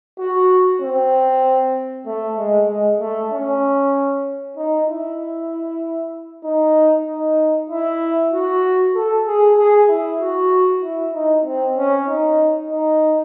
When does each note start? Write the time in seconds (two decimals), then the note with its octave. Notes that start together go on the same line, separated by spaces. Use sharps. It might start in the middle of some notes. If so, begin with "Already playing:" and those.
0.19 F#4
0.82 C4
2.06 A3
2.38 G#3
2.69 G#3
3.00 A3
3.32 C#4
4.57 D#4
4.88 E4
6.44 D#4
7.08 D#4
7.70 E4
8.33 F#4
8.95 A4
9.27 G#4
9.57 G#4
9.89 E4
10.20 F#4
10.83 E4
11.14 D#4
11.45 C4
11.76 C#4
12.08 D#4
12.71 D#4